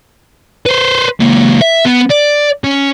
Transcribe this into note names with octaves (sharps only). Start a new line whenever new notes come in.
B4 C5
C#2 A#3
E5
B3
D5
C#4